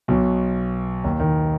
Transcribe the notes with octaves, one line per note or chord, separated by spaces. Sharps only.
B1 B2
D#2 D#3
D#2 D#3